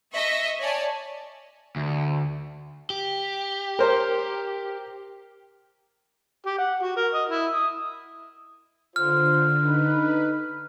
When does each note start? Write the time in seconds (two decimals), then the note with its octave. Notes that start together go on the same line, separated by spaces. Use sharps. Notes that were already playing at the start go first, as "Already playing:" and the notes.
0.14 D#5 E5 C#6
0.60 C#5 D5 G#5 A5
1.76 D2
2.90 G4
3.79 A#4 C5
6.47 G4
6.58 F#5
6.83 F#4
6.97 A#4
7.14 D#5
7.29 E4
7.54 D#6
8.96 D3 F4 C5 F6
9.64 D#4 B4